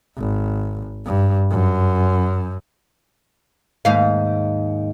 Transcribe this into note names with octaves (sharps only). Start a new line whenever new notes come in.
G#1
G2
F#2
D#2 G#2 F5